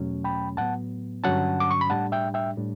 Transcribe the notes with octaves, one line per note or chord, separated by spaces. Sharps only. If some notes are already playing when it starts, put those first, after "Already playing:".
Already playing: E2 B2 F#3 A3 C#4
G5 B5
A2 F#3 B3 F#5 A5
G2 D3 F#3 C#4 F#5 A5
D6
C#6
B5
A2 G3 D4 F#5 A5
E5 G5
E5 G5
A2 G3 D4